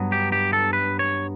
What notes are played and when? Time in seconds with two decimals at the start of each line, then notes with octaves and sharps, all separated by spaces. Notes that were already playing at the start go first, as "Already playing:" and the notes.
Already playing: G2 F#3 B3
0.12 G4
0.32 G4
0.53 A4
0.73 B4
0.99 C#5